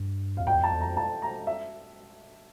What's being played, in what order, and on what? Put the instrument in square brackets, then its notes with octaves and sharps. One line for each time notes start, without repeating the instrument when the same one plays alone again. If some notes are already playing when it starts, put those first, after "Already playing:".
Already playing: [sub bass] G2
[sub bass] F2 [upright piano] F5
[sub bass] G2 [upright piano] G5
[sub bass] E2
[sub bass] F2 [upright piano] A5
[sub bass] E2
[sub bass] F2 [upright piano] A#5
[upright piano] A5
A#5
E5